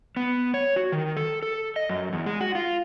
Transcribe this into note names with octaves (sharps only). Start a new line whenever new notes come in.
B3
C#5
F#4
D#3
A4
A4
D#5
F#2
E2
G#3
F#4
F4